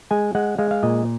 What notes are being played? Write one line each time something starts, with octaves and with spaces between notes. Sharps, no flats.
G#3 G#5
G#3 F#5
G#3 F5
F5
A#2 D#5